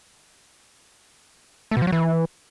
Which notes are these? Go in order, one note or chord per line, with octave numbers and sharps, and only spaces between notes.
A3
B2
F3
F#3
E3